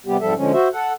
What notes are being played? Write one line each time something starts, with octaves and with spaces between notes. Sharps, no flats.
C3 G3 B3 G4
F2 G#2 F3 G3 A4 E5
D3 F3 G#3 C#4
F#4 C5 E5
A4 F#5